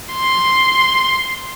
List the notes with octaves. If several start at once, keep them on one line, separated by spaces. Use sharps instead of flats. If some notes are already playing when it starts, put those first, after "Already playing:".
C6